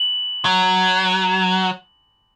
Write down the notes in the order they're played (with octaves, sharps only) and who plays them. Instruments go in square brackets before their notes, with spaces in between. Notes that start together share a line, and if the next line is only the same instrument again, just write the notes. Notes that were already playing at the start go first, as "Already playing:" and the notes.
Already playing: [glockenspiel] F#7
[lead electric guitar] F#3